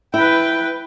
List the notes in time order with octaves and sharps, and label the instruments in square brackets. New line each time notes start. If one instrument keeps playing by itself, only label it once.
[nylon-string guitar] E4 [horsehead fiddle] B4 G5